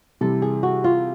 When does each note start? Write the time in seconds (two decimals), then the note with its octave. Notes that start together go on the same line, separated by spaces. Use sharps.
0.21 C3 E3 G3 A4
0.42 G#4
0.63 F#4
0.84 F4